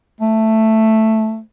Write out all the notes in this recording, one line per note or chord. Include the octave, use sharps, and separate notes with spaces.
A3